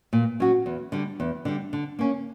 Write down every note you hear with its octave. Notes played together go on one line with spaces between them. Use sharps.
A#2
F#3 C#4 F#4
E2
D3 G3
E2
D3 G3
D3
A#3 C#4